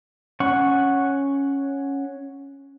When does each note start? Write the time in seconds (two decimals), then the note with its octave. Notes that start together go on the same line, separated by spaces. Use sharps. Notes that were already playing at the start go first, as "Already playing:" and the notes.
0.40 C#4 F#5 C#6